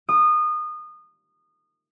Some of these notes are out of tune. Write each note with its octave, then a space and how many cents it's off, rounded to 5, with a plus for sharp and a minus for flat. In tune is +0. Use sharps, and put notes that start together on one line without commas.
D#6 -25